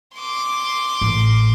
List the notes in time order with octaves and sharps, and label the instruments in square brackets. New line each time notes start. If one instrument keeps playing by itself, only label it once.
[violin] C6 D6
[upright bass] A1